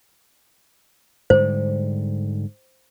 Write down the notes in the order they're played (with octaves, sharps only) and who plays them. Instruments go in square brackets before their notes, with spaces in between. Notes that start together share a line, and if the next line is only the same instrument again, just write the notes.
[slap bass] G#2 D3 G3 [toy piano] C5